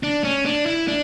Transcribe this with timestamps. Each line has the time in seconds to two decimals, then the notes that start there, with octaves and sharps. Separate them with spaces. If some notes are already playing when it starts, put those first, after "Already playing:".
0.03 D4
0.24 C#4
0.46 D4
0.66 E4
0.88 D4